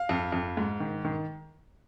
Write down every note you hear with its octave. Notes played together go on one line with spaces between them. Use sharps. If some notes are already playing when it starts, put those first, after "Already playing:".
Already playing: F5
F2
F2
G#2
D#3
D#3